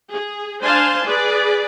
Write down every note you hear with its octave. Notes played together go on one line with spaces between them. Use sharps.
G#4
D4 C5 F5 G#5 A5 C6
G#4 B4 D5